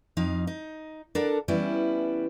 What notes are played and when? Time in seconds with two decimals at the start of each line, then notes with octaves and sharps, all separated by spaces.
0.17 F2 F3 D#4 F5
0.47 D#4
1.15 D4 A4 A#4 F#5
1.48 E3 G3 B3 C#4 E4